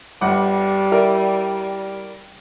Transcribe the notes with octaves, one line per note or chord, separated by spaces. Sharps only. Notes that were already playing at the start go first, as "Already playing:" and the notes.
G1 G3 F#5 D6
E4 A#4 D5